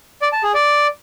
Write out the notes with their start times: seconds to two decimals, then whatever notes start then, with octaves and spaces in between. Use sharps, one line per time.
0.22 D5
0.32 A5
0.43 G#4
0.54 D5